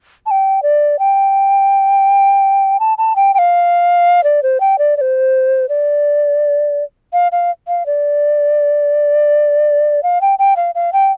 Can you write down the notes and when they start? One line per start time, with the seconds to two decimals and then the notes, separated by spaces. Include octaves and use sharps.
0.26 A5
0.31 G5
0.63 D5
0.99 G5
2.80 A5
2.98 A5
3.16 G5
3.34 G5
3.39 F5
4.24 D5
4.43 C5
4.61 G5
4.79 D5
4.97 D5
5.01 C5
5.69 D5
7.13 F5
7.32 F5
7.68 F5
7.86 D5
10.03 F5
10.21 G5
10.39 G5
10.56 F5
10.75 F5
10.93 G5